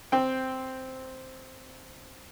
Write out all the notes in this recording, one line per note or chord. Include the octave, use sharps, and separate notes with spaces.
C4 G5